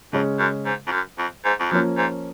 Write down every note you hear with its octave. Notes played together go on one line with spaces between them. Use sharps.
F2 C#3 G#3 C#4
F#2
G#2
F2
F#2
F2
G#2
F2
F#2 F3 A#3 C#4
G#2